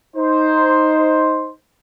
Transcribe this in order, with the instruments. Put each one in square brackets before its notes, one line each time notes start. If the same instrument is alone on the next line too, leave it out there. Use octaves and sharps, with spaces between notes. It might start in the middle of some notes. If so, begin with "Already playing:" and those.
[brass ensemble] D#4 C5